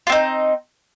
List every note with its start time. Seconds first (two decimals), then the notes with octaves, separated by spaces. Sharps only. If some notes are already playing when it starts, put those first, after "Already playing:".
0.07 F4
0.09 C4
0.12 D#4